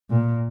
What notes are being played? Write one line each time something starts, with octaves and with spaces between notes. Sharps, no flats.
A#2